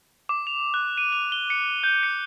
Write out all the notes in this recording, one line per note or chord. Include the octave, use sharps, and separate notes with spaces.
D6
F7
F#6
D#7
F7
G7
C#7
G6
C#7